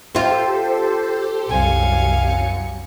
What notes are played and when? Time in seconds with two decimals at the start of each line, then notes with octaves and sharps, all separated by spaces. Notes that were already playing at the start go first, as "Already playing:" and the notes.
0.15 C4 F4 G4 A4 C5
1.49 C2 F#2 F5 G#5 C#7